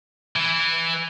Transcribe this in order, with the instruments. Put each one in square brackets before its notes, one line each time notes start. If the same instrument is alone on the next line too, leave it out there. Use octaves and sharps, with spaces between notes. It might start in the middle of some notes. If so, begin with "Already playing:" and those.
[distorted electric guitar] E3